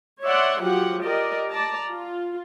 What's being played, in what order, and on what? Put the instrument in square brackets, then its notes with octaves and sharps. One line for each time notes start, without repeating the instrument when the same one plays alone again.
[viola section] C#5 D5 E5 F#5 C6
F3 F#3 F#4 G4 F#5
G4 A#4 D5 D#5
D5 A5 A#5
F4